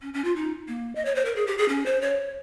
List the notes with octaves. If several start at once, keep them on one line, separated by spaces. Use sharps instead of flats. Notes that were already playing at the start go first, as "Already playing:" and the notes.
C#4
C#4
F4
D#4
A#3
D#5
C#5
C5
A#4
G#4
G4
G#4
C#4
C5
C#5